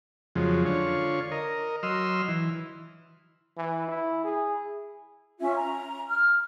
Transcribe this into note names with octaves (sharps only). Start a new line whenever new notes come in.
F2 C#3 F3 F#3 G#3
D3 F4 C#5
A#4 D#5
F#3 D#5 C6 E6 F6
E3
E3
E4
G#4
C#4 F4 E5
A#5
F6